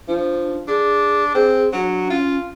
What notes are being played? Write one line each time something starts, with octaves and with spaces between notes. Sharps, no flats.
F3 D4
D4 G#4
C4 G#4
F#3 D4
C#4 F4